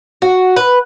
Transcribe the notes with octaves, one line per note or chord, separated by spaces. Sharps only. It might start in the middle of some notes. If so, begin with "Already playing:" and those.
F#4
B4